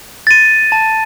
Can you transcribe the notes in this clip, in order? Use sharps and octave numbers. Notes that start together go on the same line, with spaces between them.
A6 D#7
A5